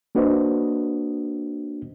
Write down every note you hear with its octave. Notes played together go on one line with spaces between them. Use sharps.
A#3 D4 F#4 B4 C5 D#5